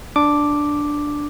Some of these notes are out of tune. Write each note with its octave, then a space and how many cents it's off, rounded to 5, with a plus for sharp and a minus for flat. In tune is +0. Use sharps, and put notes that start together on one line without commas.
D4 +0 D6 +0